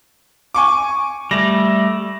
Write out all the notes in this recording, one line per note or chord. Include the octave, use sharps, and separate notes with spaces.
G#5 C#6 D6
G3 A3 A#6